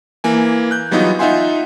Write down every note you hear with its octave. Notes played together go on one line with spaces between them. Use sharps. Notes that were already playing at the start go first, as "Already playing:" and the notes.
E3 A#3 G#5
F#6 G6
E3 F#3 G3 B3 D#4 F4
D#4 F4 E5 F#5 G#5 C6